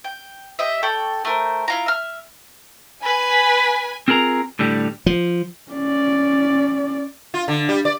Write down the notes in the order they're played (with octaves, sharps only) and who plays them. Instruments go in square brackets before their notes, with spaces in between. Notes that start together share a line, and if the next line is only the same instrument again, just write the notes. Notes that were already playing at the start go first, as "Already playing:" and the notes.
[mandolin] G5
G4 D#5 E5
A4 D5 G5 C#6
A3 A#4 C5
E4 F4 A#5
E5 F6
[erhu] B4 [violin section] G#5
[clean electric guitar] C4 F4 G#4 A#4 A#5
A2 D3 G3 G4
[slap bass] F3
[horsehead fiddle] C#4 D5
[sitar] F4
D3
G3
D5